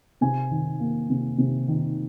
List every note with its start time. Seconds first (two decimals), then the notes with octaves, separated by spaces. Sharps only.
0.21 C3 G#5
0.51 D#3
0.80 A#3
1.10 C3
1.38 C3
1.68 D#3